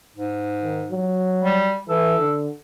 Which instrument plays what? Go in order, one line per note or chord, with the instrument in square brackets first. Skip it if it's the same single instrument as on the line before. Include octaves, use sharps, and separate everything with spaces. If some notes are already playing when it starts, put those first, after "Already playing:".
[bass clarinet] G#2
[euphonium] D#3
F#3
[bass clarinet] G3
[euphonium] E3 [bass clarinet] A4
[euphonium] D3